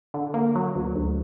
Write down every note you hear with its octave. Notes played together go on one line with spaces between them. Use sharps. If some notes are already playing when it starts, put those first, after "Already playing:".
D3
A#3
F#3
D2
D2